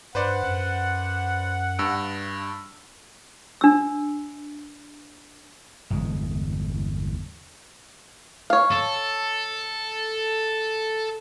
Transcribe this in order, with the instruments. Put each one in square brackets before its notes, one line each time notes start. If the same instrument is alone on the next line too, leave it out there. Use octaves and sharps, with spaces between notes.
[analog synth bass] G2 [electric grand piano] B4 C5 D5 [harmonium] F#5
[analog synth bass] F#2
[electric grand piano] G2 E6 D7
[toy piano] D4 E6
[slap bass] G1 E2 G#3
[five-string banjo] C#5 F5
[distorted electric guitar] A4